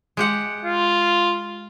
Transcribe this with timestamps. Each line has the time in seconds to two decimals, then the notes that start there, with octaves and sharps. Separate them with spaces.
0.17 G#3 G4 F#5
0.65 F4